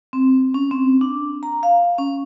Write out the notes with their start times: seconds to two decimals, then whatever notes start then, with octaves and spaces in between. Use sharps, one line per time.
0.13 C4
0.54 C#4
0.71 C4
1.01 D4
1.43 A#5
1.63 F5
1.98 C#4